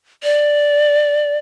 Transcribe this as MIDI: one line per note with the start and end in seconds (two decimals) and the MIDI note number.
0.23 1.38 74